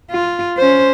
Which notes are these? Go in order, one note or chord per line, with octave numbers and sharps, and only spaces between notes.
F4
C#4 C5